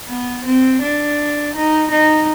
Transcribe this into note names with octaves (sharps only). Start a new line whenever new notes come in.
B3
C4
D4
D#4
D#4